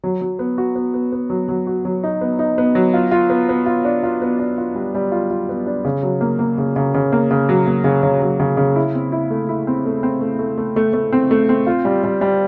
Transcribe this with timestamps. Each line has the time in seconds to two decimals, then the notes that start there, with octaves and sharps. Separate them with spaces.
0.04 F#3
0.21 F#3
0.39 B3
0.58 F#4
0.76 B3
0.94 B3
1.12 B3
1.30 F#3
1.49 F#3
1.67 F#4
1.85 F#3
2.04 D#4
2.21 B3
2.39 D#4
2.58 B3
2.75 F#3
2.94 F4
3.11 F4
3.30 B3
3.49 B3
3.66 F4
3.85 D4
4.03 F4
4.22 B3
4.39 D4
4.58 F4
4.75 G3
4.95 G3
5.12 F4
5.30 F4
5.49 B3
5.66 D4
5.85 C#3
6.03 F#3
6.21 A#3
6.39 A#3
6.58 C#3
6.76 C#3
6.94 C#3
7.12 A#3
7.31 C#3
7.49 F#3
7.67 A#3
7.84 C#3
8.03 C#3
8.22 F#3
8.40 C#3
8.57 C#3
8.76 E4
8.94 C4
9.12 E4
9.31 A3
9.49 E4
9.67 C4
9.85 A3
10.03 C4
10.21 A3
10.39 A3
10.58 A3
10.76 A3
10.93 A3
11.13 C4
11.31 A3
11.49 C4
11.67 F4
11.85 G3
12.04 G3
12.21 G3